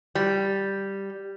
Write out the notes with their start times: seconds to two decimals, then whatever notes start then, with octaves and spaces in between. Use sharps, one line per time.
0.15 G3